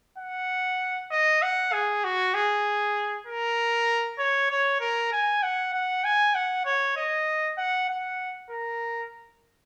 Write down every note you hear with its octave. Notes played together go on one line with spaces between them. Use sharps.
F#5
D#5
F#5
G#4
F#4
G#4
A#4
C#5
C#5
A#4
G#5
F#5
F#5
G#5
F#5
C#5
D#5
F#5
F#5
A#4